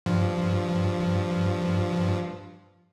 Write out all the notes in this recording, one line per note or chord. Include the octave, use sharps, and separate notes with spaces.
G2 F3